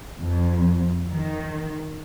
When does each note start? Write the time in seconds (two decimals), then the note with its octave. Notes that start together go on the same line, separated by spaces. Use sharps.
0.21 F2
1.12 D#3